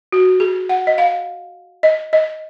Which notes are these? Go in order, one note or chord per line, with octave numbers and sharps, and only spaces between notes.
F#4
G#4
F#5
D#5
F5
D#5
D#5